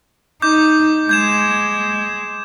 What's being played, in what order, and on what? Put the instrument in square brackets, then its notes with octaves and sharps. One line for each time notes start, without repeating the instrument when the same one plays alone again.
[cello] D#4 [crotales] D6 G6
[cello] G#3 [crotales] G6 G#6 E7